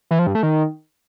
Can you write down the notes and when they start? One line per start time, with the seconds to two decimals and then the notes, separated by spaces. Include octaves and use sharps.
0.11 E3
0.19 F3
0.27 G2
0.35 A3
0.43 D#3